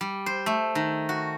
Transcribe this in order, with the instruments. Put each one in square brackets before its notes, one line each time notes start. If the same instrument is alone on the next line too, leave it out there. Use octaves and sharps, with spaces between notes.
[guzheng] G3
C5
A3
D#3
F#4